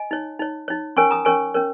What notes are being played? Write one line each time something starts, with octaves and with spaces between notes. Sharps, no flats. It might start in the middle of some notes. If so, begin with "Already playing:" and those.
Already playing: D#5 G#5
D#4 C#5
D#4 C#5
D#4 C#5
C#4 A#4 C#5 G#5 C#6
A#5 D#6
C#4 A#4 C#5 G#5 C#6
C#4 A#4 C#5